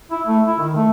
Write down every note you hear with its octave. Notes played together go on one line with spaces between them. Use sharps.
E4
A3
E4
D#3
A3